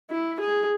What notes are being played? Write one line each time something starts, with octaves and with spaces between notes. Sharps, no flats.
E4
G#4